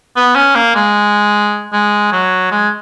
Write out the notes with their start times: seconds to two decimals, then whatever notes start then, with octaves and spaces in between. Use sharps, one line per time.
0.16 B3
0.36 C#4
0.56 A#3
0.75 G#3
1.73 G#3
2.12 F#3
2.51 G#3